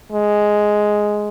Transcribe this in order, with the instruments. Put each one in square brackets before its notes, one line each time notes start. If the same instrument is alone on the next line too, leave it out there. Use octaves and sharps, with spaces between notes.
[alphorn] G#3